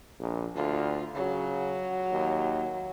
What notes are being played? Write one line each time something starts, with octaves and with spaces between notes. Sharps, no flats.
A#1
D2 F4
C#3 F#3
D#2